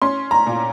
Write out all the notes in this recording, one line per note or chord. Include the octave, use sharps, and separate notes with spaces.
C#4 C6
A#5
A#2